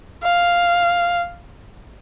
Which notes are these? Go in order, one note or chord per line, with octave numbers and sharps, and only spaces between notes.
F5